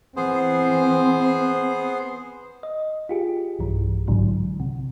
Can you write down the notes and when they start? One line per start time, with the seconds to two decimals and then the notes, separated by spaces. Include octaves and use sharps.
0.16 E3 B3 C4 G#4 C5
2.63 D#5
3.09 F4 G4 G#4
3.59 B1 G2 E3
4.08 A1 G#2 D3 E3 F#3
4.60 C3